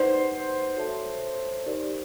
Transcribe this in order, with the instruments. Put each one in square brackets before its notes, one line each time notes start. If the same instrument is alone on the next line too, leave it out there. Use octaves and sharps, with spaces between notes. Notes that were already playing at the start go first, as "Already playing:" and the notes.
Already playing: [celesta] D#4 G4 B4 D5 F#5 [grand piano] C5
[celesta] F#4 A4 C#5 E5 A5
D#4 G4 A#4 D5